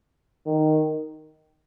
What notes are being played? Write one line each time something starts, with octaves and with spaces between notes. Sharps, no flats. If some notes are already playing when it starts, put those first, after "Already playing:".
D#3